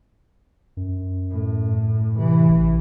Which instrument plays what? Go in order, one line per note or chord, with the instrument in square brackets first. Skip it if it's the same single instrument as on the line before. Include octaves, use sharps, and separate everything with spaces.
[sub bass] F#2
[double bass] A2
[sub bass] C3 [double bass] E3
[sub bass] A1